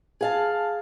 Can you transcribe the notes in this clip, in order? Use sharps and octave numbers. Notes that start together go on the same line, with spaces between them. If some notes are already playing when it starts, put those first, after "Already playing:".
G#4 F5 A5